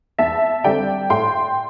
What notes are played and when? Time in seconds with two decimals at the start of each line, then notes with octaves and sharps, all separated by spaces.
0.19 E2 E5 A5
0.64 D3 G3 C4 D5 G5
1.10 A2 G5 C6